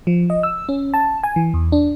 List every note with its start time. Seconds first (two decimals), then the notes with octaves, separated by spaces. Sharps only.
0.07 F3
0.30 D#5
0.43 E6
0.69 C#4
0.94 A5
1.23 G#5
1.36 E3
1.54 E2
1.72 D4